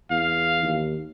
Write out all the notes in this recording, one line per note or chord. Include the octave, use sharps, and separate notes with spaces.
E2 F5
D#2